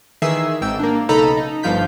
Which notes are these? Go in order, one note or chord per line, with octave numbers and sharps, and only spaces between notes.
D#3 E3 G#4 E5 E6 C7
G#1 G#2 G5 E6
A#3 D4
B1 C#3 D#4 A4 A#5 B5
D#4
G1 G2 F3 F4 G6 B6